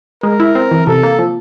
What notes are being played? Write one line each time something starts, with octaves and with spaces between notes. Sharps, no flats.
G#3 A#4
E4
C4
E3
C3 A4
A#3
F3